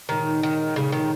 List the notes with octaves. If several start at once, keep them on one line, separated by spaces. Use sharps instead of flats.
A#2 D#3 G#3 D#4 G4 C#5
D#3
A#2 C#3 G#3 D#4 G4 C#5
D#3